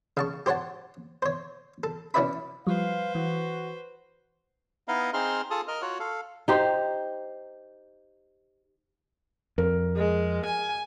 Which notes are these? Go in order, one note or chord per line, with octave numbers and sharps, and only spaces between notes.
C#3 A5 C#6
G4 C5 C#5 F#5 A5
C5 C#5
A4
C#4 E4 B4 D5 E5 B5
F3 G3 B4 C5 F5
E3 F#4
B3 D#4 E4 D#5 F5
C4 D#4 G#4 C6 F6
F4 G#4 A4 A5 D#6
A#4 D#5 F6
F4 F#4 C#5 F#5
A4 F5
D#4 G4 C5
F2 A#4
G#3
G#5